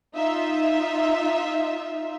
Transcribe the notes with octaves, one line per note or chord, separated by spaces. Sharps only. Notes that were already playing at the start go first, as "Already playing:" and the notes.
D#4 F4 E5